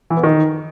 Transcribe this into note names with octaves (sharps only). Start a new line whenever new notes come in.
E3
B3
D#3